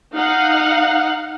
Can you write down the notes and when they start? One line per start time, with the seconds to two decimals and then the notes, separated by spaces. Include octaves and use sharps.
0.16 D#4 F5 F#5